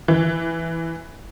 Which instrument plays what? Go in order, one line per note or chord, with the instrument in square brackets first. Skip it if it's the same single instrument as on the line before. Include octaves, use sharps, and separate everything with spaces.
[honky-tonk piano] E3